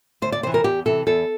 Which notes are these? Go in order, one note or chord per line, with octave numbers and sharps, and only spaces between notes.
D2 C5
D5
C3 E3 C5
A#4
E2 G4
C3 E3 A4
E2 A4